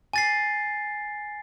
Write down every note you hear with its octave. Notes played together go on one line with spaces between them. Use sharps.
G#5 A6 C7